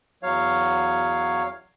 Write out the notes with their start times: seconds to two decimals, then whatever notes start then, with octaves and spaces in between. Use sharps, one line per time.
0.23 E2 F#3 C#5 F5